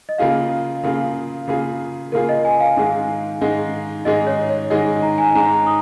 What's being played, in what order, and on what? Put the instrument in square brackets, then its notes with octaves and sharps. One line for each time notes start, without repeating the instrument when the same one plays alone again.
[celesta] D#5
[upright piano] C#3 A#3 F4 G#4 [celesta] F5
[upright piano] C#3 A#3 F4 G#4
C#3 A#3 F4 G#4
[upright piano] C#3 A#3 F4 G#4 [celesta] A#4
[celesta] D#5
G#5
F5
[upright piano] G#2 D#3 G#3 D#4 G#4
G#2 D#3 G#3 D#4 G#4
[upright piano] G#2 D#3 G#3 D#4 G#4 [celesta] D#5
[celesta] C#5
C#5
[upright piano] G#2 D#3 G#3 D#4 G#4 [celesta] D#5
[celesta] A#5
G#5
[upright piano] G#2 G#3 D#4 [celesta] A#5
[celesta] D#6